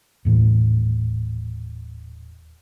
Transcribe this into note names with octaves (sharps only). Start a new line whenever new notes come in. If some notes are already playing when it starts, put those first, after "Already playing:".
D#1 A2 E3